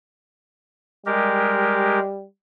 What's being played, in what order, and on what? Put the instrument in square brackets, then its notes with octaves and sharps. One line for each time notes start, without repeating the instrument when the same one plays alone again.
[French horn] G3 [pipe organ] G#3 G4 A#4